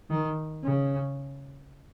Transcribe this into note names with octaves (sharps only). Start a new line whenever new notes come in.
D#3
C#3